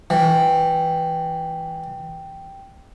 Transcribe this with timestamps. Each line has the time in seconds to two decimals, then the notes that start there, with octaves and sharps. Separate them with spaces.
0.10 E3 G5